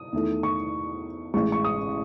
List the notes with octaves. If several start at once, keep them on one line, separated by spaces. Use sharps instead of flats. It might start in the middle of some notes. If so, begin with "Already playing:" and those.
Already playing: D#6
E2 D#3 A3
C#6
A1 A2 G#3 C#6
C#6
D#6